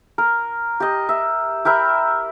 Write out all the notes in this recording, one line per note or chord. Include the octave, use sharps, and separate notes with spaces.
A#4
G4 D#5
E5
G4 A#4 E5 B5